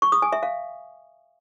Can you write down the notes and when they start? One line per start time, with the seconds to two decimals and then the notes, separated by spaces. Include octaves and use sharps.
0.02 C#6
0.12 D#6
0.22 G#5
0.33 E5
0.43 F5